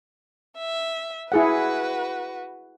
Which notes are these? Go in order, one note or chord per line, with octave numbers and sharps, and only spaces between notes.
E5
E4 F#4 G#4 B4 F#5